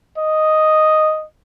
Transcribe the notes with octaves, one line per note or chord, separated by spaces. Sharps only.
D#5